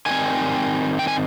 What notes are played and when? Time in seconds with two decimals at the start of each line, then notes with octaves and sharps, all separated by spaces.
0.06 D#3 G3 C4 G#5
0.99 G5
1.08 G#5